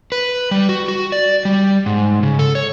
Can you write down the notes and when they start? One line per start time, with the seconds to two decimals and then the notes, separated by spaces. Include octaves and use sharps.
0.12 B4
0.51 G3
0.69 F#4
0.88 F#4
1.12 D5
1.45 G3
1.86 G#2
2.23 C#3
2.39 A4
2.55 C#5